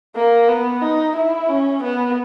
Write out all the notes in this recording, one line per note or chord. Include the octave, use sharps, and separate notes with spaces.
A#3
B3
D#4
E4
C#4
B3